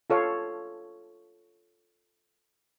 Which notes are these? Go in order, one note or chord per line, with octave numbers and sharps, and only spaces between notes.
F4 A4 C#5 F5